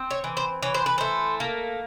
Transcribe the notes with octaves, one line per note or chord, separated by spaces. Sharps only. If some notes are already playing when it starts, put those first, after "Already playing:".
Already playing: C4
C#5
E3
C5
E3 C#5
C5
B4
A3 C5
A#3